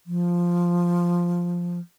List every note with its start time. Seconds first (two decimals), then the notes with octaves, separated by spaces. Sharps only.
0.06 F3